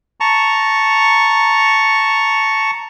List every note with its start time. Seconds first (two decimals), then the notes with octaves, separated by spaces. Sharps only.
0.20 A5 A#5 C#6